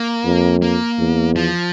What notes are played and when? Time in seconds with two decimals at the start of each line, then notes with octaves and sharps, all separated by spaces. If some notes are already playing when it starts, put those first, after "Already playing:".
Already playing: A#3
0.25 F2
0.62 A#3
0.99 E2
1.36 F3